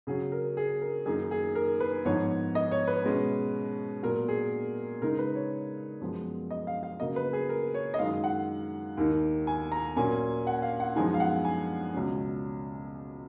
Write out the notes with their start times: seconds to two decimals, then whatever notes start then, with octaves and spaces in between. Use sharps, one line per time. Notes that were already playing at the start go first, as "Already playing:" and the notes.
0.07 C#3 F#3 C#4 G#4
0.32 A#4
0.57 G#4
0.81 A#4
1.06 F#2 D#3 A#3 D#4 G#4
1.31 G#4
1.55 A#4
1.80 B4
2.05 G#2 F3 B3 D#4 C#5
2.55 D#5
2.71 C#5
2.87 B4
3.04 B2 G#3 C#4
4.03 A#2 F#3 B3 A#4
4.28 G#4
5.02 C#3 G#3 D#4 A#4
5.19 B4
5.35 C#5
6.00 F#2 F3 G#3 B3
6.51 D#5
6.67 F5
6.83 F5
7.00 C#3 F#3 A#3 D#5
7.16 B4
7.33 G#4
7.49 A#4
7.74 C#5
7.94 D#5
7.99 F#2 D#3 G#3 F5
8.24 F#5
8.97 D#2 D#3 A#3 D#4
9.47 G#5
9.72 A#5
9.96 A#2 F#3 A#3 C#4 G#5
10.47 F#5
10.62 F5
10.80 F#5
10.96 F#2 F3 G#3 B3 D#4 G#5
11.14 F5
11.20 F#5
11.45 G#5
11.94 C#2 B2 F#3 C#4